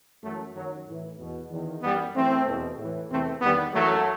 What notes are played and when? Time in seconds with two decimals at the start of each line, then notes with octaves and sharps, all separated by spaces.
0.23 F#2 E3 F#3 A3
0.55 F#2 D#3 F#3
0.87 A2 E3
1.18 E2 B2
1.50 E2 D#3
1.81 F#2 E3 G3 B3
2.14 F#2 E3 A3 C4
2.45 E2 B2
2.78 A2 E3
3.09 E2 C3 E3 A3 C4
3.41 E2 D#3 G3 B3
3.73 F#2 E3 F#3 A3